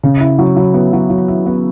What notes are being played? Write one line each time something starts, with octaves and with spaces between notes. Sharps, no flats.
C#3
E4
F#3
F#3
B3
F#3
F#3
E4
B3